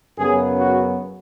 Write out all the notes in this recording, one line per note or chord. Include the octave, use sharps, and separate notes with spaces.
F#2 C#3 F#3 B3 G#4
F#4